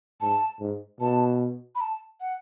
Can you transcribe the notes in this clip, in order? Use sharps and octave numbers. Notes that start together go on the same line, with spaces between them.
G#2 A5
G#2
B2 A5
B5
A5
F#5